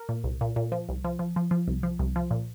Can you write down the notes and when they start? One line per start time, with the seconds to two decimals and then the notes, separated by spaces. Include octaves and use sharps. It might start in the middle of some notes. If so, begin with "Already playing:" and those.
Already playing: A#4
0.09 A#2
0.24 C2
0.41 A#2
0.56 A#2
0.72 F3
0.89 C2
1.05 F3
1.19 F3
1.36 F3
1.51 F3
1.68 C2
1.83 F3
1.99 C2
2.16 F3
2.31 A#2